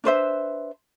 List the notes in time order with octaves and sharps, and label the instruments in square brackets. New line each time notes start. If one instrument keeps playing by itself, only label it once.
[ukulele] D4 B4 C5 E5